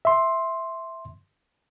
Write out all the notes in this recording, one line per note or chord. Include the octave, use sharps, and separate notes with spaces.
E5 C6